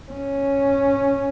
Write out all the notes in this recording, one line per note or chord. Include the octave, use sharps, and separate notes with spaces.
C#4